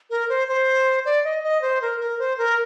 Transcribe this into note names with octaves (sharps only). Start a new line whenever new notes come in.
A#4
C5
C5
D5
D#5
D#5
C5
A#4
A#4
C5
A#4